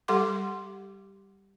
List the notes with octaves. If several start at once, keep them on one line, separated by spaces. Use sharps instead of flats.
G3 G4 A4 F#5 C6 D6